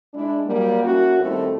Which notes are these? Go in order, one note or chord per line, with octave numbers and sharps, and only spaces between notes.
G#3 D4 E4
F#3 G3 A#3
A#3 C#4 E4 F#4
D#2 G3 A3 C4 E4 A4